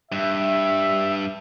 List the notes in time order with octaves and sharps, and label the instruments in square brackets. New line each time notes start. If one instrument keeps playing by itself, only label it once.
[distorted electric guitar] G2 [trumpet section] E5